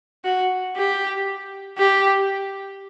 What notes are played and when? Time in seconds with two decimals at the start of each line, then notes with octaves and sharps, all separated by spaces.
0.24 F#4
0.76 G4
1.78 G4